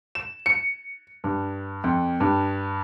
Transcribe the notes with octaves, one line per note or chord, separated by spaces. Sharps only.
E7
C#7
G2
F2
G2